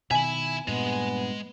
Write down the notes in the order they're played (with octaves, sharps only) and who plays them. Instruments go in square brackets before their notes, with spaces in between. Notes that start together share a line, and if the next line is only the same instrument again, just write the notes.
[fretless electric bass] B2 D#3 [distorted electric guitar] E5 B5 [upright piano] G#5
[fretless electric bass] G2 A#2 [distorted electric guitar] G#3 [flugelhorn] B3